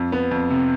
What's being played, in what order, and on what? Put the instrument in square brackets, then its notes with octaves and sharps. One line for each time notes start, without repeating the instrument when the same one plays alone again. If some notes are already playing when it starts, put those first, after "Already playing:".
Already playing: [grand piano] F2
B3
F2
C3